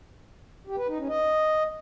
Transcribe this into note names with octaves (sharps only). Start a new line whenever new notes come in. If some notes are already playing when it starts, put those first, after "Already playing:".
G4
B4
D#4
C#4
D#5